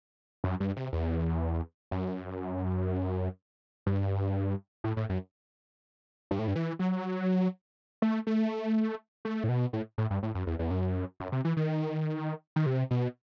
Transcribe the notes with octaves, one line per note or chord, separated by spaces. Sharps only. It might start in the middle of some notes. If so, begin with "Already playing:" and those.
F#2
G2
C3
E2
F#2
G2
A2
A2
F#2
G2
A2
G2
E3
F#3
A3
A3
A3
A2
B2
A2
A2
G2
A2
F#2
E2
E2
F#2
F#2
C3
E3
D#3
D#3
C3
B2